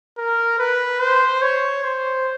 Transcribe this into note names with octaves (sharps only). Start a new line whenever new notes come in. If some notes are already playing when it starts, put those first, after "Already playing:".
A#4
B4
C5
C#5
C5